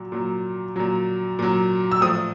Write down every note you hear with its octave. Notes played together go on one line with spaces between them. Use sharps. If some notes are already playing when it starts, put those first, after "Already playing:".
Already playing: A#2 F#3
A#2 F#3
A#2 F#3
A#2 F#3
E6
A2 F3 D#6